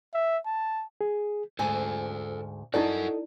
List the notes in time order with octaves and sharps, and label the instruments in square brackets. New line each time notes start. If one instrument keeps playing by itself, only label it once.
[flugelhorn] E5
A5
[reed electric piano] G#4
[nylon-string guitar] D2 G#2 G#5 [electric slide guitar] A4 C5
[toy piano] D#4 E4 D5 [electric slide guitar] F#4 A#4 F#5 [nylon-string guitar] A4 D#5